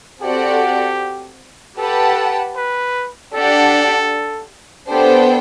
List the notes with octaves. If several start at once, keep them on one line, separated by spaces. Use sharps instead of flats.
C4 F#4 G4 A4 D5 F#5
G4 A4 B4 F#5 A5
B4
D4 G4 A4 D5 F#5
B3 D4 G4 A4 C5 G5